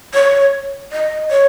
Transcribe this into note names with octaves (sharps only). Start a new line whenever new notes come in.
C#5
D#5
C#5